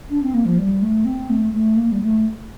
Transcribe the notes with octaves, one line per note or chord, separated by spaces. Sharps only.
D4
C4
A#3
F3
G3
A3
C4
A3
A3
A#3
G3
A3